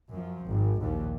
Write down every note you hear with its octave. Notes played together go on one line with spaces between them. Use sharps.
F#2 F3
G#1
A#1 D#2